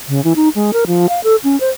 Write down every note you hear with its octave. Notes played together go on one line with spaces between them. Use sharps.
C#3
E3
D#4
G#3
A#4
F3
F5
A4
C#4
C5